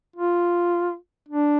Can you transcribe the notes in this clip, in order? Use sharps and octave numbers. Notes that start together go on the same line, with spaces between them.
F4
D4